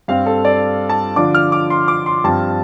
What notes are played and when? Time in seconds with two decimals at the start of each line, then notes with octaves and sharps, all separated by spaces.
0.08 G2 G3 C4 F5
0.26 A4
0.45 D5
0.89 A5
1.16 D3 F3 D4 F4 D6
1.35 F6
1.52 D6
1.70 C6
1.88 D6
2.06 C6
2.24 G2 F3 C4 F4 A5